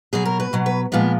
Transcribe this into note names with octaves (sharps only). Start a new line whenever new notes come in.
B2 F#3 G#4
A#4
B4
B2 F#3
B4
A#2 F3 G#3 B3